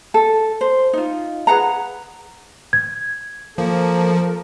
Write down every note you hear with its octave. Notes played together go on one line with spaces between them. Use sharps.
A4
C5
D#4 F4
G#4 B4 F#5 A#5
G#6
F3 A#3 A4 A#4